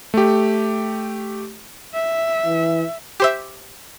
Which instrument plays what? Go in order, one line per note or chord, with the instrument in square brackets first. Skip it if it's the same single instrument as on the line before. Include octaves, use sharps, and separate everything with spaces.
[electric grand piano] A3 G4
[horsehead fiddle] E5
[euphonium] E3
[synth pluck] G4 C5 E5